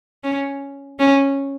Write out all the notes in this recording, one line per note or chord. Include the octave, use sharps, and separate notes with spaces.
C#4
C#4